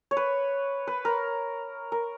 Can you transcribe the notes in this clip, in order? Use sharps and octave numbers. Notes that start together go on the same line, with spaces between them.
C#5
B4
B4
A#4
A#4